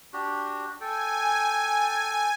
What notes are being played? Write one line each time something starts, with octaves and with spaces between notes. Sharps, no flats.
D4 F#4 G4
A4 G5 G#5